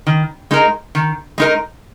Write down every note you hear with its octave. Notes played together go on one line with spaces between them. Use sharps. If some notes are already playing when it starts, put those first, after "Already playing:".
D#3
G#3 D#4 A#4
D#3
G#3 D#4 A#4